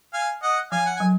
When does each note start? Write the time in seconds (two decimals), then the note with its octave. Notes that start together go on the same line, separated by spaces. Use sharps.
0.14 F5 G#5
0.42 D#5 F#5
0.72 F3 F5 G#5
0.86 F#5
0.96 F#3 G#5